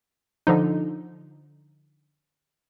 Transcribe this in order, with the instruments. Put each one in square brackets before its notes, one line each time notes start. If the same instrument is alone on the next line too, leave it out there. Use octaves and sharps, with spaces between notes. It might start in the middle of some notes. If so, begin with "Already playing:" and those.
[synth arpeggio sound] D3 F3 D#4